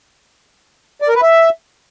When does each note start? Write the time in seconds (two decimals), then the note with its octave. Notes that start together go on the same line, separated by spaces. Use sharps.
1.02 D5
1.09 A#4
1.16 B4
1.22 E5